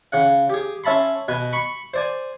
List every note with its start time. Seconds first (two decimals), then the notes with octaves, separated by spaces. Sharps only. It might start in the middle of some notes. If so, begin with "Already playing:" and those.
0.12 C#3 F#5
0.50 G4 G#4
0.84 C#4 E5 A5 B5 C6
1.28 B2 B4 G#5
1.53 B5 C#6
1.94 C5 D5 G#5